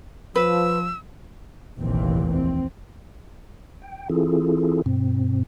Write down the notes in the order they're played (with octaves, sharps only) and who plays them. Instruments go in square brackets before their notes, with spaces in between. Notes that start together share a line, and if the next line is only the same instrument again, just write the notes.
[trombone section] F3 [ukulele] B4 [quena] E6
[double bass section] F1 A#1 D#2 A#2 E3 C4
C4
[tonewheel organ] G5
E3 C4 E4 F4 G#4 A4
G2 B2 C4